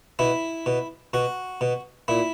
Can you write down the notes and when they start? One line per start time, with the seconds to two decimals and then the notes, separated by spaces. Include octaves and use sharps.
0.19 B2 E4
0.66 B2
1.13 B2 F#4
1.61 B2
2.08 A#2 E4